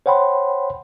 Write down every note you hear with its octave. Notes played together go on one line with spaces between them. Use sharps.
C5 C#5 F#5 G5 B5 C6